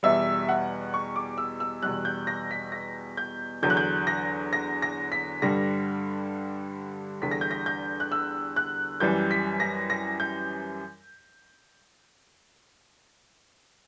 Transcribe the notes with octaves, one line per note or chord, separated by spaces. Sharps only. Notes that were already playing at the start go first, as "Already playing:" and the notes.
E2 B2 G3 E5
F#5
C#6
D6
E6
E6
E2 B2 G3 F#6
G6
A#6
B6
A#6
G6
E2 D3 F#3 G6
F#6
G6
A#6
A#6
A#6
B6
G2 D3 G3 A#6
E2 D3 G3 B6
A#6
G6
A#6
G6
F#6
E6
F#6
F#2 E3 G3 G6
B6
A#6
A#6
G6